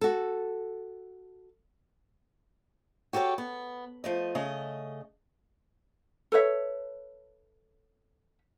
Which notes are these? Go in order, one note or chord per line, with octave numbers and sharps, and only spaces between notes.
F#4 A4
F#4 G4 A4 B4 C#5
B3
F3 A3 D#5
C#3 A3 D#5
A4 B4 C#5 E5